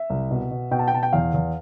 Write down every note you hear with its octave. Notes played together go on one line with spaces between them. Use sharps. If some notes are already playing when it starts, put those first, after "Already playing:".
Already playing: E5
C2
B2
B2
B2 G5
A5
G5
B2 A5
G5
E2 F5
E2